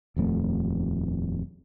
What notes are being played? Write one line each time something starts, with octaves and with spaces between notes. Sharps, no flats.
D#1 F2 A3